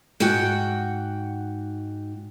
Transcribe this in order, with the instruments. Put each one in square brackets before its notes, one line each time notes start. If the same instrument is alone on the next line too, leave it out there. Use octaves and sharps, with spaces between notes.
[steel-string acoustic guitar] G#2 F#4 F#5 G5